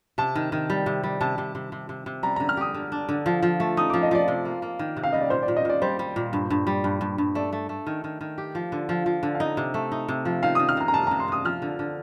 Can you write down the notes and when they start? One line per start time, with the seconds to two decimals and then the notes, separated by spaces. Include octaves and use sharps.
0.18 C3 A5
0.35 D#3
0.52 D#3
0.70 G3
0.86 C3
1.03 G3
1.21 C3 A5
1.38 C3
1.55 C3
1.72 C3
1.89 C3
2.06 C3
2.23 G3 A#5
2.36 D3 A#5
2.49 F6
2.57 G4 D#6
2.74 D3
2.92 D4
3.09 D3
3.26 F3
3.43 F3
3.60 A3
3.77 D#4 D#6
3.90 F3 D6
4.03 D#5
4.11 F3 D5
4.28 C3
4.45 A#3
4.62 A#3
4.79 D#3
4.97 C3
5.03 F5
5.13 G3 D#5
5.21 D5
5.30 A#2 C5
5.43 D5
5.48 A#2
5.57 D#5
5.65 A#2 D5
5.82 G3 C5
5.99 G3
6.16 A#2
6.33 G2
6.50 G2
6.67 G3
6.84 G2
7.01 G2
7.18 G2
7.35 A3 D5
7.53 A3
7.69 A3
7.87 D#3
8.04 D#3
8.21 D#3
8.38 G4
8.55 F3
8.72 D3
8.89 F3
9.06 F3
9.23 D3
9.35 F5
9.40 D#4 D#5
9.57 C3
9.74 A3
9.92 D#4
10.08 C3
10.25 F3
10.43 D#3 F5
10.55 D#3 D#6
10.69 F6
10.77 C3 A#5
10.88 A#5
10.94 C3 A5
11.07 C3 A#5
11.20 C6
11.28 C3 D#6
11.45 F3 F6
11.62 D3
11.79 D3